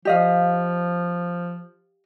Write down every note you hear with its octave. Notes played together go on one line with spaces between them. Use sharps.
F3 G4 D#5 F5